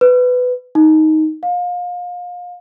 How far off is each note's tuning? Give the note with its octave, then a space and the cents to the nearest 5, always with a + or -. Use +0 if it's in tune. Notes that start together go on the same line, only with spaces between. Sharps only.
B4 +15
D#4 +10
F5 +30